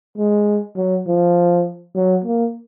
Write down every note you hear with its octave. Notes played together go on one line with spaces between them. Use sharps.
G#3
F#3
F3
F#3
A#3